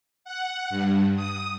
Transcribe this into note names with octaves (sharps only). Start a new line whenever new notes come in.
F#5
G2
D#6